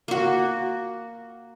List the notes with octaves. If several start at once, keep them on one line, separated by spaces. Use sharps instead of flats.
A#3 F#4